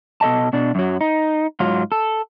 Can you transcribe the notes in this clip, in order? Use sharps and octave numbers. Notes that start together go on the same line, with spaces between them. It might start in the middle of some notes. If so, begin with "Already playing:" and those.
B2 A4 D#5 A5
B2 D4
F#2 F#3
D#4
G#2 F#3 F4
A4